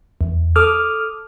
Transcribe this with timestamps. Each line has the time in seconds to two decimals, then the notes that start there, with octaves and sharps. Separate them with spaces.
0.21 E2
0.56 A4 D6 D#6 F6